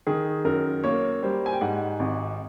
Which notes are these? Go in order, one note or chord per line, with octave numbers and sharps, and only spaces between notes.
D#3 G#4
F#2 A#4
A#3 C#5
G3 C5
G#5
G5
G#2 F#5
G#1